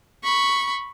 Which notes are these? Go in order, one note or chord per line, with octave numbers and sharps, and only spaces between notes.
B5 C#6